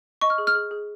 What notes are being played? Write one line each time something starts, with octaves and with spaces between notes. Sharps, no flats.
D#5 C#6
F6
G#4
F6
G#4
G#4